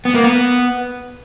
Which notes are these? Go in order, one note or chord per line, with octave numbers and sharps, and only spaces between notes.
B3
A#3
B3